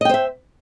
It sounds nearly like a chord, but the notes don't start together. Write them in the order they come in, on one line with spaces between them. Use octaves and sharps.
D#5 G5 C5 E5